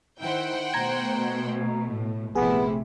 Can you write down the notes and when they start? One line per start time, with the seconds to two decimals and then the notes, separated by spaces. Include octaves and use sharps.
0.21 D#3 E4 C5 F#5 G5
0.74 B2 A3 A#5 G#6
1.90 A2
2.36 A#1 C3 A3 B3 E4 G#4